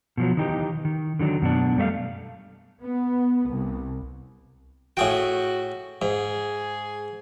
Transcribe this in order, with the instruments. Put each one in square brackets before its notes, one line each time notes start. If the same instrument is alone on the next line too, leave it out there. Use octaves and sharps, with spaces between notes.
[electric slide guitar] B2 F3 F#3
D#3 E3 D#4 G4
D#3
D3 D#3 F#3 D4
F#2 B2 D4
G3 A3 E5 F5
[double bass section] B3
C2
[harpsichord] A2 G#4 G5 [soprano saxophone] F#4
[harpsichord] G#2 [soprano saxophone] G#4